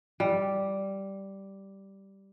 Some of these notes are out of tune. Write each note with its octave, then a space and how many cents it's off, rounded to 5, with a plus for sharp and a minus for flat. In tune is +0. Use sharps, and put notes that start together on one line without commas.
G3 -5